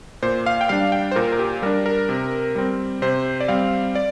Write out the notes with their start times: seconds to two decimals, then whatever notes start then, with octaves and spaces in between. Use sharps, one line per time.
0.23 A#2 C5
0.46 F5
0.61 G5
0.69 G3 D4 F5
0.92 G5
1.11 C5
1.16 A#2 A#4
1.32 A#4
1.39 G4
1.62 G3 D4 A#4
1.86 A#4
2.09 C3
2.55 G3 C4
3.02 C3 C5
3.40 D5
3.48 G3 C4 F5
3.95 D5